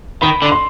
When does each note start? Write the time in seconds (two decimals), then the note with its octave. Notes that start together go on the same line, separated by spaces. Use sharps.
0.22 D#3 B5
0.42 D3
0.52 C6